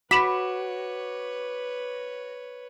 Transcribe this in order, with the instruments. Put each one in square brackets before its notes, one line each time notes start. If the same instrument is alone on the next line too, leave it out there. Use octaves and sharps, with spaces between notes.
[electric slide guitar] F#4 [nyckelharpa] B4 C#5 [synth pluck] B5 [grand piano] D6 E7